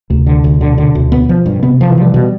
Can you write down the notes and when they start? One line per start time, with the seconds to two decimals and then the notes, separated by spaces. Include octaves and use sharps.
0.10 D2 C3
0.26 D3
0.44 D2
0.61 B2 D3
0.78 D3
0.95 D2
1.12 B3
1.29 F3
1.46 G2
1.63 C3 B3
1.81 F3
1.89 E3
1.97 F3 G3
2.14 B2